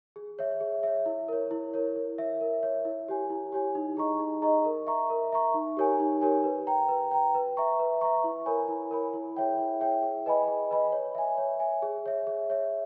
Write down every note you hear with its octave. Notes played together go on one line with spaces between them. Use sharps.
G#4
C#5 E5
G#4
C#5 E5
E4
A#4 C#5
E4
A#4 C#5
A#4
C#5 E5
A#4
C#5 E5
E4
G4 C#5 G#5
E4
G4 C#5 G#5
D#4
G#4 D#5 A#5 C#6
D#4
G#4 D#5 A#5 C#6
A#4
E5 A#5 C#6
A#4
E5 A#5 C#6
D#4
G4 A#4 C#5 G#5
D#4
G4 A#4 C#5 G#5
B4
G5 A#5
B4
G5 A#5
B4
E5 A#5 C#6
B4
E5 A#5 C#6
E4
A#4 C#5 G#5 B5
E4
A#4 C#5 G#5 B5
E4
G#4 C#5 E5 G5
E4
G#4 C#5 E5 G5
G#4
B4 D#5 G#5 B5
G#4
B4 D#5 G#5 B5
C#5
E5 G#5
C#5
E5 G#5
G#4
C#5 E5
G#4
C#5 E5